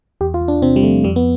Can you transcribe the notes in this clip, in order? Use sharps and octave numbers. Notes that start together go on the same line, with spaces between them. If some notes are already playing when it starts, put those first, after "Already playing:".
E2 G4
F4
E2
D4
C3 C4
G3
F3 A3
F2 G3
B3